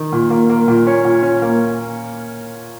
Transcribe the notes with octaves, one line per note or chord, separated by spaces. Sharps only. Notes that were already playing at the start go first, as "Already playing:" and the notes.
Already playing: D#3
A#2
A#3
A#3
A#2
C#4
A#2
C#4
A#3